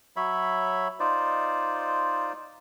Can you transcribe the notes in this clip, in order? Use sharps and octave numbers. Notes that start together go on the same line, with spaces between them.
F#3 C#5 E5 B5
D#4 F4 C5 D5